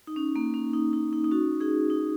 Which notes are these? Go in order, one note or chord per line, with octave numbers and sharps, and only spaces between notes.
D#4
C#4
A#3
C#4
D#4
D#4
D#4
D#4
C#4 F#4
D#4 G#4
D#4